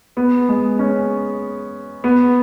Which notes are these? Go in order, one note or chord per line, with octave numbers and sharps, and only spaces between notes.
B3
G#3
C#4
B3